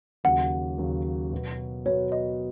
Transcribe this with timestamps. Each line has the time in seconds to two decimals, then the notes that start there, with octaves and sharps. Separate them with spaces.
0.24 D#2 C#3 F#3 F#5
0.78 D#2 C#3 F#3
1.33 B2 F#3 B3
1.85 B2 F#3 B3 C#5
2.12 D#5